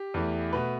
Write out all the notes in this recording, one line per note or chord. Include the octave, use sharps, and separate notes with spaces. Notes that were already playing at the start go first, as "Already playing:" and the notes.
Already playing: G4
E2 E3 A3
B2 A3 B4